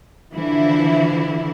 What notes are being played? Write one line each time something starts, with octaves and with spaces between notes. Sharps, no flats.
D3 E3 F3 E4